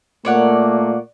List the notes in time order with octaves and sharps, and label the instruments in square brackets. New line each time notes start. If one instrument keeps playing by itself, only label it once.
[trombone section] A#2 A3 A#3 [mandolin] C#5 D5 F#5